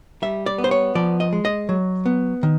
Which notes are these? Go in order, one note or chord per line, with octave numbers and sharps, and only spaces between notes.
G3 E5
D5
B3
C5
C#5
F3 D5
D#5
G#3
D#5
F#3
B3
D#3